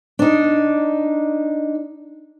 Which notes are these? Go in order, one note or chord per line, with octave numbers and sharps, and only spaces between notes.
D4 D#4